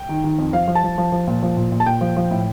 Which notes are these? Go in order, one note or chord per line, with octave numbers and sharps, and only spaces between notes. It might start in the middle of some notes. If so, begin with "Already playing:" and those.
Already playing: G5
D#3
D#3
F2
F3 F5
F3
A5
F3
F3
F3
A#2
F3
A#2
A#2
A5
A#2 G5
F3
F3
A2